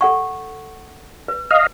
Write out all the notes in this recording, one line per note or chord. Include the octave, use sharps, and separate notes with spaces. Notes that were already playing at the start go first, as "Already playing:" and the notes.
A4 F#5 C#6
B4
D#5 F5